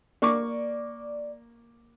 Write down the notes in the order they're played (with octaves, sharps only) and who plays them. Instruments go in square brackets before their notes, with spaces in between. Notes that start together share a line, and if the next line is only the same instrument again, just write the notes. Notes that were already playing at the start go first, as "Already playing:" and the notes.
[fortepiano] A#3 C#6 D6 [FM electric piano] D5